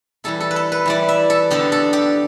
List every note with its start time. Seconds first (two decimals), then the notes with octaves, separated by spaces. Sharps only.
0.24 E3 G3 E4 A4
0.40 A4
0.51 B4
0.56 A4
0.72 B4
0.86 E3 G3 E4 D5
1.09 E5
1.30 A4
1.51 D3 B3 D4 G4
1.72 A4
1.93 G4